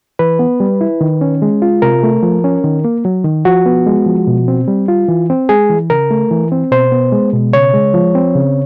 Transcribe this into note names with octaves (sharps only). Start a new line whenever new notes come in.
E3 B4
B3
G3
E4
D#3
C#4
G#3
F4
C3 A#4
A3
F3
C#4
D#3
A#3
F#3
D#3
F3 F#4
B3
G#3
F3
B2
C4
G3
F4
E3
C4
G#3 G#4
E3
C#3 A#4
A3
E3
C4
B2 C5
B3
G#3
B2
C#3 C#5
G#3
F3
C4
C#3